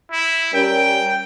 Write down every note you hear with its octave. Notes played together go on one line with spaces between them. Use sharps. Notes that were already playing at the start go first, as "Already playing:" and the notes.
E4
G3 C#4 A#4 G5